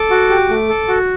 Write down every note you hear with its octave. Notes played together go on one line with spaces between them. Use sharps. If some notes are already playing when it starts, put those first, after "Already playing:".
Already playing: A4 D6
F#4
G4
A3
A4
F#4